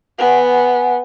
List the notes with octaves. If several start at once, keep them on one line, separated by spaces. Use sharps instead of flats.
B3 F#5 G#5